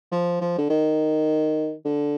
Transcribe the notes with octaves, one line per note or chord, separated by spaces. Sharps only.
F3
F3
D3
D#3
D3